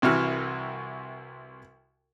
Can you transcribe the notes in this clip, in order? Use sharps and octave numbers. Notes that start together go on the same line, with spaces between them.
C2 C3 E3 F#4 F6